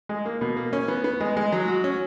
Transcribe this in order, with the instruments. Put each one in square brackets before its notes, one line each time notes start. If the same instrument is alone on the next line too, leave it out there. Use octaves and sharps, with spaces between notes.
[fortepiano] G#3
A#3
B2
A#3
C#4
B3
B3
G#3
G#3
F#3
F#4
C#4